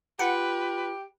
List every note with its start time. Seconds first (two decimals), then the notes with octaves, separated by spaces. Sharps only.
0.19 F4 G4 B4 F#5